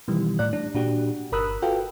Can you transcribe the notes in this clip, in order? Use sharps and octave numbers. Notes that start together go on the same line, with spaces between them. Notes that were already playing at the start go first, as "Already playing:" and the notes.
B2 D#3 E3 G3
A2 D5 F#6
D4
A#2 D4 F#4 G4
G1 A#4 B5 D#6 E6 F#6
F4 F#4 A4 B4 F5 G5